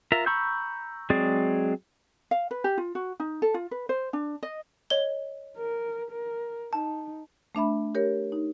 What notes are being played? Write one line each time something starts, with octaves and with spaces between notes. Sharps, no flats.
F4 A#4 E5 A#5
A#5 B5 C#6 E6 G6
F#3 G#3 C4 G#4 D5
F5
B4
G4
F4
F#4
D#4
A4
F4
B4
C5
D4
D#5
C#5 D#5 G7
A#4
A#4
D#4 A5
A3 D4 E5 B5
G4 A#4 C#5
D#4